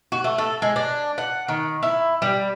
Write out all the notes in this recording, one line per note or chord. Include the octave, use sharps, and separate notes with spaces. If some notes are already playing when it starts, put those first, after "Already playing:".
F#4
A3
A4
G#3
D4
F#5
D#3
E4
G3